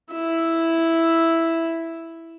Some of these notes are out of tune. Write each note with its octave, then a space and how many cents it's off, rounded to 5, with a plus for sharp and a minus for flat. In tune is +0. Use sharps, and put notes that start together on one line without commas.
E4 +0 E5 +0